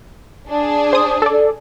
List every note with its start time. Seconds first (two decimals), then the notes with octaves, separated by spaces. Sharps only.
0.48 D4 G#4
0.93 C5 D#6
1.22 A4 D5